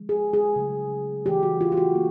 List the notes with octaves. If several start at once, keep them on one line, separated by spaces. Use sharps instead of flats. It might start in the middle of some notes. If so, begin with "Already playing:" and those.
Already playing: D3 F3 G#3
G#4
G#4
C#3 F#3 A3
C#3 E3 A3 G4
F#4
F4
G4
F#4
A#3